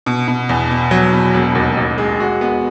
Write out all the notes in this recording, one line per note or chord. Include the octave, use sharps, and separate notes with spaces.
B2
B2
E2
B2
F#3
B2
E1
D#2
A1
G#3
F#4
B3